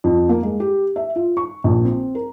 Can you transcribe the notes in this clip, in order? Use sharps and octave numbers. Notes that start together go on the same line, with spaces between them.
F2
A#3
G#3
G4
E5
F4
C#6
A#1
C4
A#4